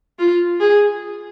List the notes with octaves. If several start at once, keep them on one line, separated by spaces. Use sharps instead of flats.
F4
G#4